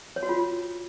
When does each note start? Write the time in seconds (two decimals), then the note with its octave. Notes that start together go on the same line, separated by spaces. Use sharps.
0.16 C#5
0.23 F#4
0.29 F4